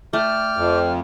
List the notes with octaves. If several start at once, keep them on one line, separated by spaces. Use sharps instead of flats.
A3 D5 G5 D6 F6
F2